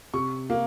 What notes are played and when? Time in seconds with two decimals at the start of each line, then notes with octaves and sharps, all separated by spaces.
0.14 C3 C#6
0.50 A#3